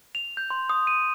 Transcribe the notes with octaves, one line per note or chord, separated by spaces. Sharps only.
F7
G6
C6
D#6
D#7